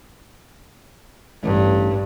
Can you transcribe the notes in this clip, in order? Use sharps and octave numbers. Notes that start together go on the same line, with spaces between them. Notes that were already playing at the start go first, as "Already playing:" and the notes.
A1 G2